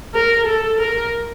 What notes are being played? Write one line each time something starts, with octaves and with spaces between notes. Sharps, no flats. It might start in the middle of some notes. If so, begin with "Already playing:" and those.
A#4
A4
A#4